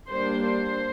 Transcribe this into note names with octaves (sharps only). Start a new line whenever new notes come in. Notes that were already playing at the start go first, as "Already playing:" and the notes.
G3 A#3 D4 C5
C5